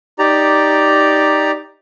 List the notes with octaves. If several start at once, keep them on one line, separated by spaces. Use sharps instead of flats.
D#4 G4 D5 A#5